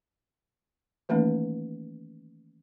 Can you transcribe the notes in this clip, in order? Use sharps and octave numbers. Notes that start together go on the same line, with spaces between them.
D#3 E3 A3 A#3 C#4 D#4